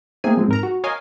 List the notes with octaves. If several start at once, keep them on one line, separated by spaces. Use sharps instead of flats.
A3 A#3 C4 D#4 G#4 G#5
F3 G#3 C4
G#2 A#4 A#5
F#4
A#4 C#5 D#5 F5 G#5